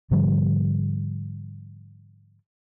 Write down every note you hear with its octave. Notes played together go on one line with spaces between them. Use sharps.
G#2 D3 F3 G3